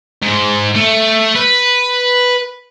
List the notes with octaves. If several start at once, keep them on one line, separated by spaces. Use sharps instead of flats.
G#2
A3
B4